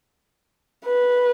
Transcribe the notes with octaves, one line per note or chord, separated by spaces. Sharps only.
B4